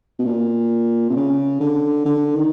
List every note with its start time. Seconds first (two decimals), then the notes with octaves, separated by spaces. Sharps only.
0.19 B2
0.26 A#2
1.10 C3
1.16 C#3
1.61 D3
2.06 D3
2.35 D#3